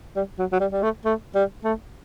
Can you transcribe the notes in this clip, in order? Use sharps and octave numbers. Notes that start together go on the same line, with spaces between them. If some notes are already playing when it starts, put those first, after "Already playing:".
G3
F#3
F#3
G3
G3
A3
A3
G3
A3